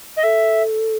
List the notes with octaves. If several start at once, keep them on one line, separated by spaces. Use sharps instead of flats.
D#5
A4 E5